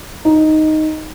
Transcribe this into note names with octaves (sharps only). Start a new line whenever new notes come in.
D#4